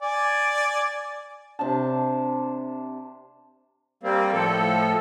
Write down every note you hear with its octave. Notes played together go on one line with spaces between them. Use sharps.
D5 G#5
C3 D4 A5
G3 A#3 C4
A2 F3 A4